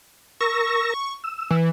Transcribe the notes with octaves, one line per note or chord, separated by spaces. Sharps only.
A#4 C#6 E6 A#6
E6
E3